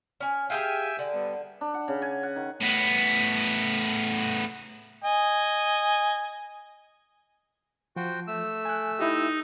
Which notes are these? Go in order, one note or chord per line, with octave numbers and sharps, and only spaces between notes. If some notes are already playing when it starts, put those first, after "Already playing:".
C#4 G#5
G4 G#4 E5 F5 G5 G#5
D3
G3 B3
D4
F#5
C#3
G#5
F#5
D#3
A2 B3
D#5 G#5
F3 F#4 C5 G5
A3 E6
G#5 F#6
D#4 E4 G4